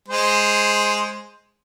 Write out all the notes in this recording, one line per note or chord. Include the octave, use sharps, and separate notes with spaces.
G#3 C5